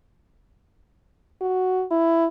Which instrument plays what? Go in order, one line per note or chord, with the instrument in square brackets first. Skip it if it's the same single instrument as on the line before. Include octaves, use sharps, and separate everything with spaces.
[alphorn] F#4
E4